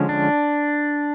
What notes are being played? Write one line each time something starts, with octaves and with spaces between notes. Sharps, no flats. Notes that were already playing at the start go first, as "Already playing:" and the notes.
Already playing: D3 F3 G#3 C#4
D4